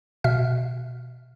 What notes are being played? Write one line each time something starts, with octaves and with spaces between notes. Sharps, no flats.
B2 E5 F6